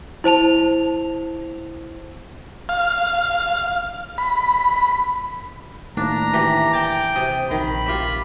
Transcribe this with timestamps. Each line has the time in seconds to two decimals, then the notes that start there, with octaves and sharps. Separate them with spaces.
0.24 E4 C5 A5 F7
2.69 F5
4.18 B5
5.97 A2 D#3 A#3 D4 A#5
6.33 E3 G4
6.74 G5 A5 D6 A6
7.16 C3 D#6
7.51 A#1 D#3 B5
7.86 F4 G4 E5